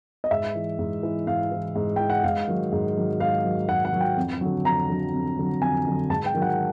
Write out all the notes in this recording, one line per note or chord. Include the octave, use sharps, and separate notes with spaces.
D#5
G#2 E5
E3
G#2
E3
G#2 F5
E3
G#2
E3 G5
F#5
G#2 F5
D#3 F#3
G#2
D#3 F#3
G#2 F5
D#3 F#3
G#2 F#5
F#5
D#3 F#3
G5
F2
D3 F#3
F2 A#5
D3 F#3
F2
D3 F#3
F2 G#5
D3 F#3
G#2 A5
G5
D#3 F#3
F#5